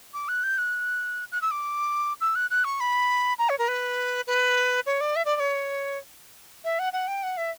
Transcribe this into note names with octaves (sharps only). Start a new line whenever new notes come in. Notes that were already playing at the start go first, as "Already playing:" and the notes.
D6
F#6
G6
F#6
F#6
E6
D6
E6
F#6
F#6
C#6
B5
A#5
C#5
A#4
B4
B4
C#5
D5
E5
D5
D5
C#5
E5
F#5
F#5
G5
F#5
E5